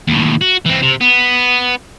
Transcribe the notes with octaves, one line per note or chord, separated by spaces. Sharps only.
D#2 A2
F#4
E3 C4
C3
B3